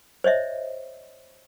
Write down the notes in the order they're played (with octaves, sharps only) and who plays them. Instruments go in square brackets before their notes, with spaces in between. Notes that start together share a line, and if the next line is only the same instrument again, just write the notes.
[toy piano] C5 C#5 D#5 E5